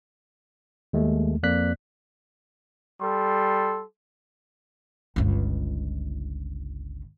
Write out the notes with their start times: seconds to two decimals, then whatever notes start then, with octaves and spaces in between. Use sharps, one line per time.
0.93 D#2 G#3 A3
1.43 F2 A#3 D5 F#6 B6
3.02 G3 A4 C6
5.16 G1 C#2